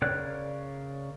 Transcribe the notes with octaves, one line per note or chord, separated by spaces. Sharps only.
C#3 A#4 C#5 D5 F#6